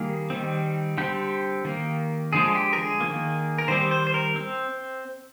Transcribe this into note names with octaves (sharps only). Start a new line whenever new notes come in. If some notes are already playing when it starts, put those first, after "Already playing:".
Already playing: D#3 G3 A#3 G#4
D#3 G3 C4
D3 G3 C4 G4
D#3 A#3
D3 F3 G#3 G#4
G4
A#4
G#4
D#3 A#3
A#4
D#3 G3 C4 C5
C5
C5
A#4
C4